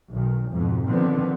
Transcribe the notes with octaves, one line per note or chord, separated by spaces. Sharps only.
B1 D#3
F2 G#2 B2
D3 D#3 F3 B3 C4